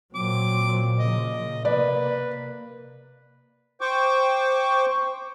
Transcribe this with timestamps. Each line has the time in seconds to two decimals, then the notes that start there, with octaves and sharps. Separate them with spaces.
0.14 A#2 F#3 C4 D6
0.99 C#3 F3 D#5
1.65 C3 A#3 B4 D5
3.81 C5 G5 C#6 D6